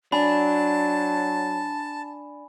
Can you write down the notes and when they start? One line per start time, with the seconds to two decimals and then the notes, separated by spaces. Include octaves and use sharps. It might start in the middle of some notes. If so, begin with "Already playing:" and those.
0.12 F#3 D4 G#5 A5 B5